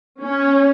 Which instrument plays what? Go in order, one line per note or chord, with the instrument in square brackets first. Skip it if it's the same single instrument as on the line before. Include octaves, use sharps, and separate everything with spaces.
[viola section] C#4